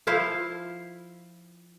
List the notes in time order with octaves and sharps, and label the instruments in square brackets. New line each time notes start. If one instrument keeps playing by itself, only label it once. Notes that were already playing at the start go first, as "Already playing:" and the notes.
[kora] F3 E4 C5 F5